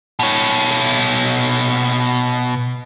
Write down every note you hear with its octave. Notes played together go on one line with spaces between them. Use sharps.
B2 C#5